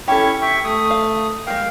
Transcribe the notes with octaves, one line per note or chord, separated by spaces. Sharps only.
C#4 E4 G4 A4 C#6
E5 G5 C#6
A3 D#6
F5
G#3 A#3 F5 G5